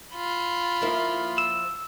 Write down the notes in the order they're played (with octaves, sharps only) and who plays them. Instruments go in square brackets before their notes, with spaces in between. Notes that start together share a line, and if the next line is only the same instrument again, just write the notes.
[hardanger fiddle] F4 B5
[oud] F3 A#3 E4
[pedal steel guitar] E6